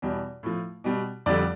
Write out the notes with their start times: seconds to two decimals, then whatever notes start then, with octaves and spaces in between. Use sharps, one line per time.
0.02 E2 B2 G3
0.43 A2 F3
0.84 B2 G3
1.26 F2 D3 G3 D5